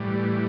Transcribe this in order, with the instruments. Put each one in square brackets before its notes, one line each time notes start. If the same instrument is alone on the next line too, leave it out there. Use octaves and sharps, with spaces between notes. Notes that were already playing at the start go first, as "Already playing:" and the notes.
Already playing: [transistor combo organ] A2 E3 G3